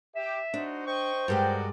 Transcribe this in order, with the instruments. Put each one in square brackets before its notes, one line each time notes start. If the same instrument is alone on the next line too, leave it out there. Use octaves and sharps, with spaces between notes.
[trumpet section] G4 [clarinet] E5
[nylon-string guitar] D4 [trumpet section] D#4 F#4 C5
[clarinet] C5 [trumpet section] D#5 G5 C#6
[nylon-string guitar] G2 G#3 G4 [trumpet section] F#4 A#4 D5 [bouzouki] G5